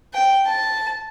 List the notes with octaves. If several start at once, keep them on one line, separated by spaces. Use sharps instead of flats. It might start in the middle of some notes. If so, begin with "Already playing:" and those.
G5
A5